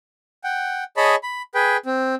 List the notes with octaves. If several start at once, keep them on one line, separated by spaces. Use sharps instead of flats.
F#5 G5
G#4 C#5 D#5 A5 B5
B5
G#4 B4 G5
C4